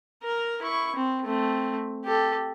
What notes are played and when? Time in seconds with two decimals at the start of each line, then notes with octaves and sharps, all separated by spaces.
0.23 A#4 A#5
0.62 E4 C#6
0.95 C4
1.25 A3 C4
2.05 G4 A4